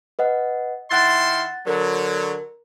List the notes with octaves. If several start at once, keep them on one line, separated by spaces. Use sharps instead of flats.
B4 D#5 F#5
D#3 E4 F#5 C6 F#6 A6
D3 F#3 A#4